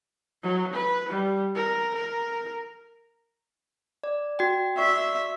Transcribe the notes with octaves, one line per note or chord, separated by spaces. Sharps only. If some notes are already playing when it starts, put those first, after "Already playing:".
F#3
B4
G3
A#4
A#4
D5
F#4 G5
F#4 D5 E5 C#6